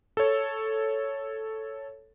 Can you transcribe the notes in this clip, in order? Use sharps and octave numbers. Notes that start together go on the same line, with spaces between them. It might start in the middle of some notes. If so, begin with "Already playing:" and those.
A4 C#5